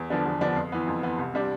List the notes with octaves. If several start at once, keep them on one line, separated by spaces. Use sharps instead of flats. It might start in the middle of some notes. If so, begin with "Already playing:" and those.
Already playing: E2
D3 F3 B3 D4
E2
D3 F3 B3 D4
F2
E3 B3
F2
E3 B3
C2
C3 G3 D4